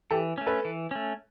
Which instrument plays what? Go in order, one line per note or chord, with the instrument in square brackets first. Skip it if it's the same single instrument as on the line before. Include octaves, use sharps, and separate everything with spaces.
[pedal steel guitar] E3 [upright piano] G4 A4
[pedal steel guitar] A3 C#4
[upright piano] A4 B4
[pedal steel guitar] E3
A3 C#4